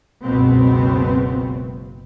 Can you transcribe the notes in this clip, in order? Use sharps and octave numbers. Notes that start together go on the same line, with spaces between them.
F#1 C#2 B2 B3 C4